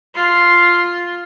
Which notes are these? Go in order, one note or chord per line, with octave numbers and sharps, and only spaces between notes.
F4 C6